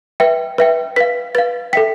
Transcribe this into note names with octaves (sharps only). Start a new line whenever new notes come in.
B4 E5 G5
B4 E5 G5
B4 F5 B6
B4 F5 A6
A4 E5 G5 B6